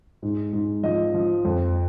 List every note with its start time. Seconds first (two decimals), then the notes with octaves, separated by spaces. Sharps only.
0.22 G#2
0.53 G#2
0.84 F3 D#5
1.14 F3
1.45 F2